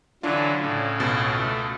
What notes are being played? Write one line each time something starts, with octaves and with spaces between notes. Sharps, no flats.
D3 E3 F#3 D4 F4
A2 C#3
C#2 B2 A6
A3